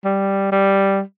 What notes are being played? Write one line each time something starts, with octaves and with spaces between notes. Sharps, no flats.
G3
G3